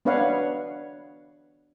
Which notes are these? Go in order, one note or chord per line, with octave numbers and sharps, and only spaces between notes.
B3 D4 B4 C#5 F5 F#5